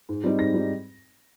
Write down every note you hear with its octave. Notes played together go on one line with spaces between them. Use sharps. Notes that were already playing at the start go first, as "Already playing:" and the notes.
G#2
G3 C4 D#4
G#2 A#6
G3 C4 D#4